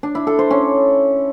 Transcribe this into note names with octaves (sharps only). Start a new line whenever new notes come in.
D4
E4
A4
C5
C#4